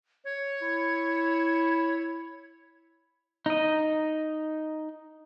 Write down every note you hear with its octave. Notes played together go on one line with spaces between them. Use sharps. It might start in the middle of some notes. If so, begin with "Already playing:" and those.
C#5
E4
D#4 D#5